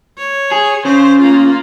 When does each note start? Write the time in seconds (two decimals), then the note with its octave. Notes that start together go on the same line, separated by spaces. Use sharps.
0.18 C#5
0.51 G#4
0.85 C#3 C5
1.19 A#3 F4